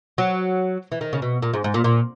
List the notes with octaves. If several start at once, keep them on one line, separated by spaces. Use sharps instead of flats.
F#3
E3
D#3
C#3
B2
A#2
G#2
G#2
A#2
A#2